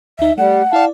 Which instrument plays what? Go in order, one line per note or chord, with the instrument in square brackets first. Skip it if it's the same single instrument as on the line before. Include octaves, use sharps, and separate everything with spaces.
[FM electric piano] D2 D#4 [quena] E5
[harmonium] G3 [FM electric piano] A3 [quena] F#5
[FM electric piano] E4 D5 [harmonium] F5 A5